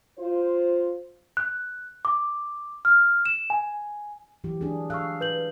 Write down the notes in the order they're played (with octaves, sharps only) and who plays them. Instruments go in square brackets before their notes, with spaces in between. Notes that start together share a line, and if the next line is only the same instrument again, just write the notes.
[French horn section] F4 C5
[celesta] F#6
D6
F6
E7
G#5
[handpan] E3 F#3 G4
D4 G#4
[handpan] A4 F5 [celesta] C#6 E6 F#6
[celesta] B4 G6 F#7